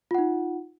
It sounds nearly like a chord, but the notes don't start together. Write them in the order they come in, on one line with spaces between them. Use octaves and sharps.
F4 F#5 D#4